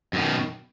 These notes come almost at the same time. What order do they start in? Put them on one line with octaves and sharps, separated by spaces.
F#2 D#3 B2